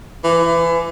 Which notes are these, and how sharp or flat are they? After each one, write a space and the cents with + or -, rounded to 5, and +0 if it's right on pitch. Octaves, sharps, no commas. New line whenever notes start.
E3 +30